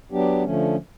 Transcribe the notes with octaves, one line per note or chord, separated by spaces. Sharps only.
F#3 B3 D4 G4
D3 F3 A3 C#4